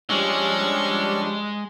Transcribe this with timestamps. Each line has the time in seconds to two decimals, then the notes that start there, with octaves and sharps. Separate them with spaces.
0.10 F3 G3 G#3 C#4 D4 C#6 E6